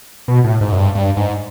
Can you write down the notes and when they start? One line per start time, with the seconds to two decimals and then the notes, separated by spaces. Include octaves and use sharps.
0.28 B2
0.44 A2
0.61 G#2
0.72 F#2
0.78 G2
0.95 G2
1.16 G#2